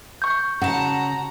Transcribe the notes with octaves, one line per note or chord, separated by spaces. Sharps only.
C#6 G6
C#3 F#4 F#5 A5 A#5